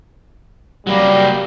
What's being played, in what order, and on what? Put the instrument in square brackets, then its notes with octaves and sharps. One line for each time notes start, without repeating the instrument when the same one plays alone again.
[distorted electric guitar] F#3 A#3 [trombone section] G3